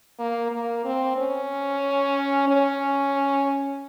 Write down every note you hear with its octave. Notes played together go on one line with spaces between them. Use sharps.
A#3
A#3
C4
C#4
C#4